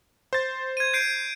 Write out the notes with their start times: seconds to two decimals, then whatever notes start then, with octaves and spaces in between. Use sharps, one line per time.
0.33 C5 A6
0.77 G#6 D#7
0.94 G6 C7 D7